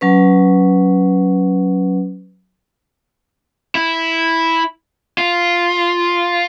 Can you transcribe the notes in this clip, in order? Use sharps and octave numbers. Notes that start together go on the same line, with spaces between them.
F#3 C#4 B4
E4
F4